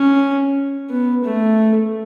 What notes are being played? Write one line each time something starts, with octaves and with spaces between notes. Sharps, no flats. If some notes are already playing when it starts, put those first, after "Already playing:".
Already playing: C#4
B3
A3